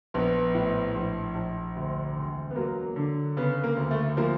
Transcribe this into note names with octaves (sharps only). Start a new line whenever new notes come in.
A#1 B3
A2
A#1
A#1
D2
E1
B3
F#3 A#3
D3
C#3 B3
A#3
D2
A3
F3 A#3